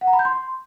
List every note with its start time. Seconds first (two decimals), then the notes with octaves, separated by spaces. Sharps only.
0.01 F#5
0.07 A#5
0.13 B5
0.19 G6
0.25 C6